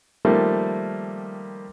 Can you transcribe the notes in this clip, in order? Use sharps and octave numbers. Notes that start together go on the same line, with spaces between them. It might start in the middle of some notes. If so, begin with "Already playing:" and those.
D#3 F3 G3 A3 A#3